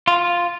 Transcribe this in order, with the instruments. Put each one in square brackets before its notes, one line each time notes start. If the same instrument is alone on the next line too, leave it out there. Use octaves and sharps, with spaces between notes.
[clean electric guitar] F4